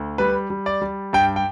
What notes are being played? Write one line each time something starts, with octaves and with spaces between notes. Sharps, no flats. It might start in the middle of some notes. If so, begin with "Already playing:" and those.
Already playing: D2
G3 B4
G3
D5
G3
G2 G5
G5